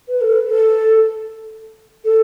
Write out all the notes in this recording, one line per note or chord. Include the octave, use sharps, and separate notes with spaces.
B4
A4
B4
A4
A4